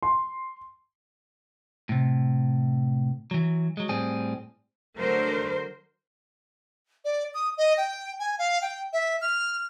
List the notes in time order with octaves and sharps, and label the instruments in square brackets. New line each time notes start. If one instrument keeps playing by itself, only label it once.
[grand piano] C6
[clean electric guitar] A2 C3
E3 F#3
F#3 G#3
A2 G3 C4 G#4
[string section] D3 F#3 A3 [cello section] A#4 C5
[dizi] D5
D#6
D#5
G5
G#5
F5
G5
E5
F6